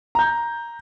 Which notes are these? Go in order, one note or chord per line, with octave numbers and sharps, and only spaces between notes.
A#5 G6